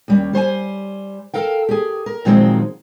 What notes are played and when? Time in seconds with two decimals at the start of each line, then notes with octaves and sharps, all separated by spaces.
0.08 D#2 G3 C#4
0.33 G3 C5 C#5 G#5
1.34 A4 A#4 F5 G5
1.69 G4 G#4
2.06 A#4
2.25 A#2 D#3 F3 F#3 G#3 C4